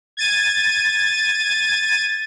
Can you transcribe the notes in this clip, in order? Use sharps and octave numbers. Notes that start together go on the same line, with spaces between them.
G#6 A6 D#7